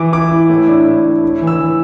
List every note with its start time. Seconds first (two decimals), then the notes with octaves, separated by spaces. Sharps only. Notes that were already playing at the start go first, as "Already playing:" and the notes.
Already playing: E3 E4 D6
0.12 E4 D6
0.31 E4
0.50 A2
0.68 D4
0.86 A2
1.05 A2
1.23 E4
1.41 E3
1.47 E6
1.59 E3